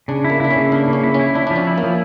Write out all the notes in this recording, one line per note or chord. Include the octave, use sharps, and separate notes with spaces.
C#3 D4
E4
A#3
D4 E4
C#4
C#3
A#3 D4
C#3
C#4
E4
C#4
E4
D4 E4
F3 D4
C#4
E4
A#3
F3